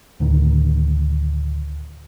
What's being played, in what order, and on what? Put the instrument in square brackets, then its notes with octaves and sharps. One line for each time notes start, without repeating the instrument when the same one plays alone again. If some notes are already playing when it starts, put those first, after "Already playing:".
[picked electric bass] D2 A2 D#3